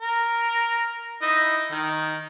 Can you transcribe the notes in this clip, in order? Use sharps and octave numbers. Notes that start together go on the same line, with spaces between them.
A#4
D#4 E4 D#5
D#3